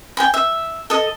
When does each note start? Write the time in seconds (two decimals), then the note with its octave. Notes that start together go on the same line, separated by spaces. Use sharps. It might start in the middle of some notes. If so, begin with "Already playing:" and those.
0.17 G5 G#5 B5
0.34 E5
0.90 A4 D#5